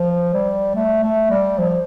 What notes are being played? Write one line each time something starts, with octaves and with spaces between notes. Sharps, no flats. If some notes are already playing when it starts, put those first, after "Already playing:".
Already playing: F3
G3
A3
A3
G3
F3